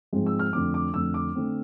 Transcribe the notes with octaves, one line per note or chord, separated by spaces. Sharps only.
G#2 F3 G#3 C4
E6
F6
F2 D3 A3 C4 D6
D6
F2 D3 A3 C4 E6
D6
D3 A3 C4